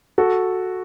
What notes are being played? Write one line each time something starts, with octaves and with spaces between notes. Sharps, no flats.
F#4 A4